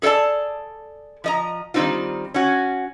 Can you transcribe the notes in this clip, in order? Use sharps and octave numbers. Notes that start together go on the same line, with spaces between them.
G#4 A4 C#5 D5 A5
F3 D#5 A#5
D#3 G3 A#3 C4 D#4 F4
C#4 F#4